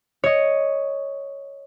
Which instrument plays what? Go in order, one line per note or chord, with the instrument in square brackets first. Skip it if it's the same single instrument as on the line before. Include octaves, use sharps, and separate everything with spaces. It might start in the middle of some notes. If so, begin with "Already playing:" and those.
[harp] C#5 D#5